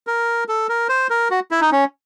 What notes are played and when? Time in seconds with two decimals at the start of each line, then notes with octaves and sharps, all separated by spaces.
0.07 A#4
0.49 A4
0.69 A#4
0.89 C5
1.10 A#4
1.31 F#4
1.51 E4
1.61 D#4
1.72 C#4